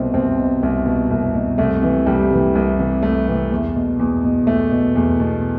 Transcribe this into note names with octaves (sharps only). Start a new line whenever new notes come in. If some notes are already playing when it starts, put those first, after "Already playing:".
Already playing: C2 B2 C4
C2 C4
B2
C2
B2
C2
B2
C2 A3
C3 E3
C2 G3
C3 E3
C2
C3 E3
C2 A3
C3 E3
E2
B2
E2
B2
E2 A3
B2
E2
B2